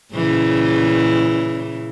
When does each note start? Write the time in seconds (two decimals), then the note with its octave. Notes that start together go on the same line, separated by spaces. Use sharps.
0.15 A#2 C#3 E3